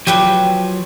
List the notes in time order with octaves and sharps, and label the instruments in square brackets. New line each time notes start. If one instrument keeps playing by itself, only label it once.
[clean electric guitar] F3 F#3 [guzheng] G4 B4 G5